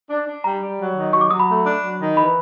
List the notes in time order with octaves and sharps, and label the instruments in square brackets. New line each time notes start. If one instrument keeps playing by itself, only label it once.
[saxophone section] D4
D4
[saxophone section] G3 [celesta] A#5
[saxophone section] G3
F#3
D#3
[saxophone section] F#3 [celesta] C#6
[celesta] D6
[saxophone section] F#3 [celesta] D#6
[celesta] B5
[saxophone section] A3
D4
F#3
D#3
[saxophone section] E3 [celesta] B5